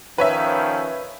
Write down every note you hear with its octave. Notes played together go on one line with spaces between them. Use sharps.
D#3 F3 C#4 B4 C#5 E5